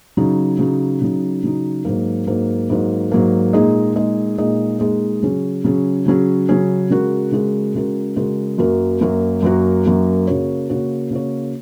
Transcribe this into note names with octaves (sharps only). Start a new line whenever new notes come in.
C#3 F#3 D#4
C#3 F#3 D#4
C#3 F#3 D#4
C#3 F#3 D#4
G#2 F#3 A#3
G#2 F#3 A#3
G#2 F#3 A#3
G#2 F#3 A#3
A#2 G#3 D#4 G#4 D#5
A#2 G#3 D#4 G#4 D#5
A#2 G#3 D#4 G#4 D#5
A#2 G#3 D#4 G#4 D#5
C#3 F#3 C#4 G#4
C#3 F#3 C#4 G#4
C#3 F#3 C#4 G#4
C#3 F#3 C#4 G#4
C#3 G#3 F#4 A#4
C#3 G#3 F#4 A#4
C#3 G#3 F#4 A#4
C#3 G#3 F#4 A#4
F#2 F#3 A#3 F#4 A#4
F#2 F#3 A#3 F#4 A#4
F#2 F#3 A#3 F#4 A#4
F#2 F#3 A#3 F#4 A#4
C#3 A#3 F#4 C#5
C#3 A#3 F#4 C#5
C#3 A#3 F#4 C#5